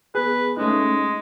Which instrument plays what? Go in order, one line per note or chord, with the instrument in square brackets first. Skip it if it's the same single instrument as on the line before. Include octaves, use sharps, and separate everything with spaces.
[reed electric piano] B3 G#4 [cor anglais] B4
[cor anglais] G#3 [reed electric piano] A3 C#4 D#4